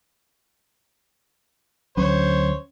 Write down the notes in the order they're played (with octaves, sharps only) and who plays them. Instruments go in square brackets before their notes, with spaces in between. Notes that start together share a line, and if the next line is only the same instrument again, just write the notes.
[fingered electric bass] D2 F#3 [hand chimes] C#4 [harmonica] C5 C#5